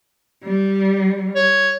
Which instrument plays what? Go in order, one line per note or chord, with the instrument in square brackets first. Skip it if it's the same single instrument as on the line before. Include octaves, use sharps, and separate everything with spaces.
[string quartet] G3
[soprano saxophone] C#5